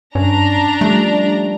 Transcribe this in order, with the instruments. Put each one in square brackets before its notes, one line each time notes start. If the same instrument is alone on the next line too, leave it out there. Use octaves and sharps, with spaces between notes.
[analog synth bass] G2 [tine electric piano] C#4 [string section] D4 A#5
[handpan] F3 G3 [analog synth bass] A3